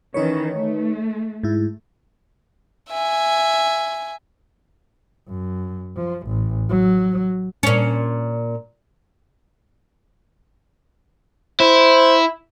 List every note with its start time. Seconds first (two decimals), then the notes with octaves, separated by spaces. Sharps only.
0.14 D#3 E3 C#4 D#4 B4 C#5
0.52 A3
1.43 G#2 E4
2.90 E5 G#5
5.29 F#2
5.96 F3
6.28 A1
6.70 F#3
7.63 A#2 C#4
11.60 E4 C5